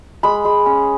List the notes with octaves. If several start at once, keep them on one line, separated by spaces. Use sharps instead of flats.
G#3 B5
G#3
C#4